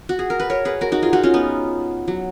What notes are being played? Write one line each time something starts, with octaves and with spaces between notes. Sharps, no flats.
F#4
G#4
A#4
B4
A#4 C#5
G#4 B4
F#4 A#4
D#4 F#4
F4 G#4
D#4 F#4
C#4 F4
B3 D#4
F#3